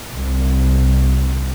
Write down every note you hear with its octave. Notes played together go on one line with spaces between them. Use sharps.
C2